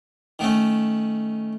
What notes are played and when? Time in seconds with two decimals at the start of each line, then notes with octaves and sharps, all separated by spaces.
0.39 D#3 A3 C#4